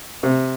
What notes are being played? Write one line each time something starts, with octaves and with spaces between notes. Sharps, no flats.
C3